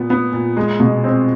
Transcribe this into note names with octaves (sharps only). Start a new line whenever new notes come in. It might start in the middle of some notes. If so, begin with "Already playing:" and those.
Already playing: A#2 B3
B3
A#2
G#3
B2
C4